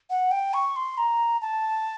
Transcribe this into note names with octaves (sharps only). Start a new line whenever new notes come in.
F#5
G5
C#6
C6
A#5
A5